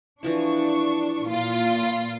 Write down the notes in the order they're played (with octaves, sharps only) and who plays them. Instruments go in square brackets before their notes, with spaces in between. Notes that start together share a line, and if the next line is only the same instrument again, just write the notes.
[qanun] E3 F3 E4 [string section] D4 C#6
[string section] A#2 F4
[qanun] B5